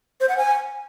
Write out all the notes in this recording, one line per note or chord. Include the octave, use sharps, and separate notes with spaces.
C5
F#5
G#5